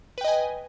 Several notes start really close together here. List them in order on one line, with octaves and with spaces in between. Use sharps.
B4 G5 D#5 G#5